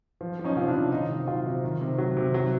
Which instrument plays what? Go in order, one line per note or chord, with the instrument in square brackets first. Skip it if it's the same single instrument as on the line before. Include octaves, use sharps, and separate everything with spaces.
[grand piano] F3
F3
C#4 D#4
C3 F4
D4 E4
C3
D#3 D#4 F4
C3
F#3 D#4 F4
C3
D#3
C3
F#3
C3
F#3